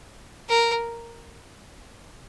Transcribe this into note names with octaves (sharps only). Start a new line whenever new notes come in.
A#4